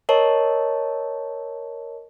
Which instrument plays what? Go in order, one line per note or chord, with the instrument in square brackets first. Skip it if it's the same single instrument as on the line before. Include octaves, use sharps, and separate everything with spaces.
[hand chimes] A#4 C#5 D#5 A5